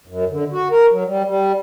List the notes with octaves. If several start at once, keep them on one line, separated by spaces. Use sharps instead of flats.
F#2
D3
F#4
A#4
F#3
G3
G3